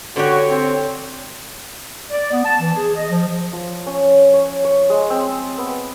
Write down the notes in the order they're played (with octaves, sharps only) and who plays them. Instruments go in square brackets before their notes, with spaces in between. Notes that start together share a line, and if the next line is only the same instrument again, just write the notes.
[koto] D3 G4 [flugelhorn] F#4 [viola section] C#5
[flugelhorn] C4
[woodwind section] D5
B3
A5
E3
G#4
D#5
F3
[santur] F3
C#4
C#5
C#5
G#3
C4
B3